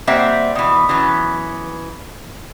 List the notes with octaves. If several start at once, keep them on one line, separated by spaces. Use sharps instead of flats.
G3 A#3 C4 E5 F#5
B2 E3
E3 F#3 B3 C#4